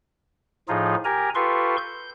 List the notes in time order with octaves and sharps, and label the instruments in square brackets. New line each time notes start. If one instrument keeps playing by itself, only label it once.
[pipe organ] A2 F3 D#4 F4 G#4
G4 A#4 G#5 A#5
F4 G4 A4 B4 C6 C#6
G6